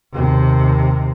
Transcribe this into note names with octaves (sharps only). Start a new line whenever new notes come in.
D#2 C3